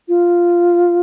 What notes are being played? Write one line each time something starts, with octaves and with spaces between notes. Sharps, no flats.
F4